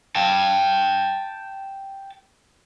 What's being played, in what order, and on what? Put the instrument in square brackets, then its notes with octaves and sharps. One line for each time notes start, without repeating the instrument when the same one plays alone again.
[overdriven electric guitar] G5 A5